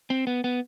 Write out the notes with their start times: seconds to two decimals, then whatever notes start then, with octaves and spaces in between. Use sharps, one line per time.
0.10 C4
0.27 B3
0.44 B3